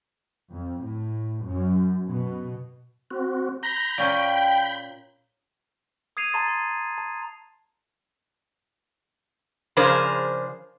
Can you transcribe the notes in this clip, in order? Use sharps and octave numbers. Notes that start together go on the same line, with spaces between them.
F2
A2
F#2
B2
C4 F#4
A#5 B5 G6
A#2 C#4 G5
D#6 G#6 C7 D#7 F7
A5 A#5 C6 A6
C6
A5
C#3 F3 D4 G#4 A#4 C5